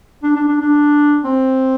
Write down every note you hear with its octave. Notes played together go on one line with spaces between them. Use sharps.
D4
D4
D4
D4
C4